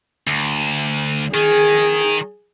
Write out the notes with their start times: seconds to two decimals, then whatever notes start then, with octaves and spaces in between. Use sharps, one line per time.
0.27 D2
1.34 D#3 G#4